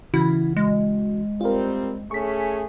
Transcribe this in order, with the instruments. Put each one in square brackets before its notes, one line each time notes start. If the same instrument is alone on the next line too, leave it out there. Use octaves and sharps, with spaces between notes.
[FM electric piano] C#3 E3 F#4 [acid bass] E4
[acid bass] G#3
[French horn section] G3 C4 [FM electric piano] F4 A#4
[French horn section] A3 C#4 G#4 [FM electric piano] C#6 B6